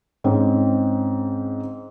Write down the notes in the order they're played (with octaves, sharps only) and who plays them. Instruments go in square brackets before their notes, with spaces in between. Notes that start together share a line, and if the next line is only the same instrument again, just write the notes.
[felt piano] G#2 C4 C#4